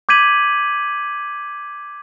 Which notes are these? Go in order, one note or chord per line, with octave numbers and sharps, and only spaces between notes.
D6 G6 G#6 B6 D#7 F#7